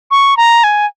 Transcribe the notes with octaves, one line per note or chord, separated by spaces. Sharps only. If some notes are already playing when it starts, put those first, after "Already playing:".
C#6
A#5
G#5